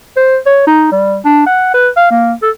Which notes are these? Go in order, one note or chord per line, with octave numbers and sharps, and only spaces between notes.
C5
C#5
D#4
G3
D4
F#5
B4
F5
A#3
A4